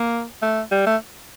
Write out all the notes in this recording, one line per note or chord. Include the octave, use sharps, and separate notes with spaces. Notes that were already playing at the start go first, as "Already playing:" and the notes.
Already playing: A#3
A3
G3
A3